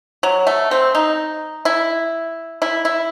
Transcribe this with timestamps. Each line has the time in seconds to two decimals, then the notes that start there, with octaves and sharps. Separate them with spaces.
0.23 F#3
0.47 A3
0.71 C4
0.95 D#4
1.65 E4
2.62 E4
2.85 E4